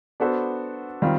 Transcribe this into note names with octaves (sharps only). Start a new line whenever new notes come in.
B3 D4 F#4 A4 C5
D#3 G3 C4 F4